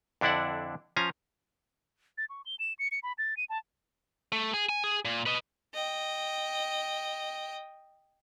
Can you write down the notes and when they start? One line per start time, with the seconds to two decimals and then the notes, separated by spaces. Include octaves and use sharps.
0.21 F2 D3 D4 E4 D5 F#5
0.96 F3 C#4 F5 G#5 A#5
2.18 A6
2.30 C#6
2.46 G7
2.59 E7
2.79 C#7
2.92 C#7
3.03 B5
3.18 A6
3.37 D#7
3.50 A5
4.32 A3
4.54 G#4
4.69 G#5
4.84 G#4
5.05 A#2
5.26 B4 D#5
5.74 D#5 G5